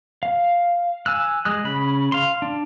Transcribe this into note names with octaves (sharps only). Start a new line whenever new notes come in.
F5
G#5 E6 F#6
G#3 D#6 F#6
C#3 B5
F5 C6
D4